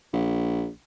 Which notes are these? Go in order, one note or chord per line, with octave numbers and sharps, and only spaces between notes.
A#1